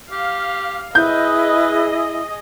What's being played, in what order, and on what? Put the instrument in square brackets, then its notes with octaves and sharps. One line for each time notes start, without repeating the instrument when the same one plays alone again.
[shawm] G4 [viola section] F5
[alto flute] E4 [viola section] G#4 D#5 [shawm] B4 [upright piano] G6